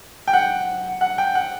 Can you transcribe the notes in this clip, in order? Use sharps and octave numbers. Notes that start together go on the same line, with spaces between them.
G5
F#5
F#5
G5
F#5